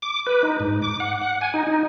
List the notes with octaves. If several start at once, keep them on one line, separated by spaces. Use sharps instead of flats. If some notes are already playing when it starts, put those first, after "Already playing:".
D6
B4
D#4
G#2
D6
F#5
F#5
G#5
D#4
D#4